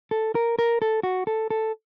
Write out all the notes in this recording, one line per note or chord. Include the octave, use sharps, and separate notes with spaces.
A4
A#4
A#4
A4
F#4
A4
A4